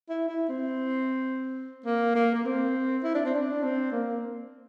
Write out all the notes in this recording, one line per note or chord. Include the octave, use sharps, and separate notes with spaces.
E4
E4
C4
A#3
A#3
A#3
C4
E4
D4
C4
D4
C4
A#3